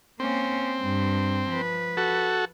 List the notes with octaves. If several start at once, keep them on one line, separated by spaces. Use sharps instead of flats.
A#3 C4 C#4
G2
F3 B4
F#4 A4